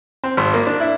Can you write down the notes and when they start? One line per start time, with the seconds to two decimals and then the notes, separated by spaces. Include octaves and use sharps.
0.24 C4
0.37 G#1
0.54 A#3
0.67 D4
0.80 E4